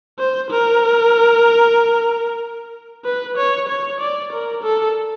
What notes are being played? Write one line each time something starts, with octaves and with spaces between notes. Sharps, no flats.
C5
A#4
B4
C#5
C#5
D5
A#4
A4